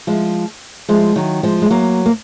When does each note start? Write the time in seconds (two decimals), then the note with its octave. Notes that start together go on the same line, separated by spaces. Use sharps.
0.07 F3 G#3
0.89 F3 G#3
1.16 D#3 F#3
1.43 F3 G#3
1.62 G#3
1.70 F#3 A#3
2.06 A#3